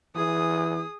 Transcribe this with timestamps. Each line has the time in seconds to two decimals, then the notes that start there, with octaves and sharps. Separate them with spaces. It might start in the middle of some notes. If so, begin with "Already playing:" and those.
0.16 E3 G#4 D#6